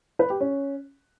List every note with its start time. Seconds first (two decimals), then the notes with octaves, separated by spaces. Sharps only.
0.19 B4
0.30 G4
0.40 C#4